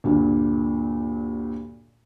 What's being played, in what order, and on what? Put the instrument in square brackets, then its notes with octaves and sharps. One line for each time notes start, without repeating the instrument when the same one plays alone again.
[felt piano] D2 G2 A#2